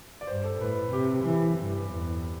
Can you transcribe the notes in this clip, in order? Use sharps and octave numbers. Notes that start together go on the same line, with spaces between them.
D5
G2 C5
A4
A2 B4
C3 G4
E3
G2
E2